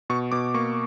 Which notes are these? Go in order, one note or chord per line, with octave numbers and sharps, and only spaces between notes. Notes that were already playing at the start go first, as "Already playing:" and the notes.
B2 C#6
B2 D6
A#3 C#6